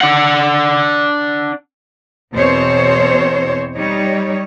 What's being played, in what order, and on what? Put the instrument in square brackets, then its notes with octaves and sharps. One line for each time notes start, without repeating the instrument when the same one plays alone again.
[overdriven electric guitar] D4 F#5
[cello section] E2 B2 C4 C5 C#5
G3 D#4 C#5